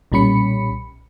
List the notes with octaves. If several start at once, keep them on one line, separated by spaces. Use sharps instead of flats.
B1 A#2 G3 C#4 B5 C#7